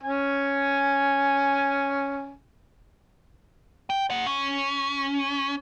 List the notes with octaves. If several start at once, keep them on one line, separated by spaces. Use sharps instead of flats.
C#4 G#5
G5
G#4 F#5
C#4